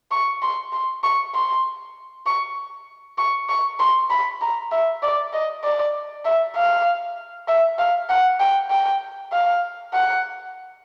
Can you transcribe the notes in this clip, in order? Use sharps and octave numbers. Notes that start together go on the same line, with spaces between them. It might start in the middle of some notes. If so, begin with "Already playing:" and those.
C#6
C6
C6
C#6
C6
C#6
C#6
C#6
C6
B5
A#5
E5
D5
D#5
D5
E5
F5
E5
F5
F#5
G5
G5
F5
F#5